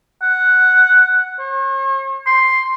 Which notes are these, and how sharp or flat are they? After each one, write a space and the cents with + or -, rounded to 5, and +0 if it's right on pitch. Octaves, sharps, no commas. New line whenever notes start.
F#5 +0
C#5 -45
C6 +5